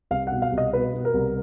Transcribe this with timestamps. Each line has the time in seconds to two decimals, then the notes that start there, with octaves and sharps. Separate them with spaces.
0.11 C2 F5
0.27 B2 F#5
0.42 F5
0.52 C2
0.58 D#5
0.73 B2 B4
0.94 B2
1.05 A#4
1.14 C2